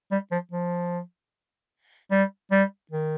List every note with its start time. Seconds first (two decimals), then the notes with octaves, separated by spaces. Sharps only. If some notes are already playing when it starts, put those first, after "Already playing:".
0.12 G3
0.32 F3
0.52 F3
2.11 G3
2.51 G3
2.91 D#3